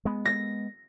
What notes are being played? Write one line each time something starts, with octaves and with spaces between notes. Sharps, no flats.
G#3 B3
A#6